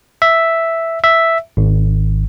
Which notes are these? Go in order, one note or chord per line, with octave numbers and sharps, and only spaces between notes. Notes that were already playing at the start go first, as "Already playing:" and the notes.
E5
E5
G#1